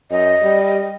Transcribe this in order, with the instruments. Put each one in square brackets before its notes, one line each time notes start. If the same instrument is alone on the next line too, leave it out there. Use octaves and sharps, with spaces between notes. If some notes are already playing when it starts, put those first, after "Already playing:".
[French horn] F#2 [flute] D#5
[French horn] G3